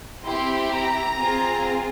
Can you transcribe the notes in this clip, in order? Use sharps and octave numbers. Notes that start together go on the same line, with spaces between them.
C4 E4 G4 C6
A#5
C4 F4 G#4